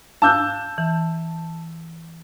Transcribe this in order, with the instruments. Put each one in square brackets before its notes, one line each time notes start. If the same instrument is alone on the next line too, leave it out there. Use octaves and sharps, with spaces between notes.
[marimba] F5 D6 F#6 [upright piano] A5 E6 G6
[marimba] E3